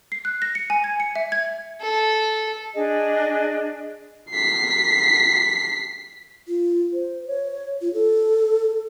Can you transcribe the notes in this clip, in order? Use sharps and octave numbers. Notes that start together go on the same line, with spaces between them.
C7
F#6
A#6
C#7
G#5
G#6
C#7
E5
G#6
A4
D4 G#4 D#5
B6 C7
F4
C5
C#5
F4
A4